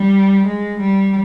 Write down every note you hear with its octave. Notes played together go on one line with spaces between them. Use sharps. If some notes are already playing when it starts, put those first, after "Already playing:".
Already playing: G3
G#3
G3